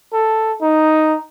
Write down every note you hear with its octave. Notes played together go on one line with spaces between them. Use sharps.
A4
D#4